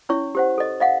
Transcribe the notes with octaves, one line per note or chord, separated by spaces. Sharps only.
C#4 E4 C#5 C#6
G4 C5 F#5
A4 D#5
D#5 F5 F#5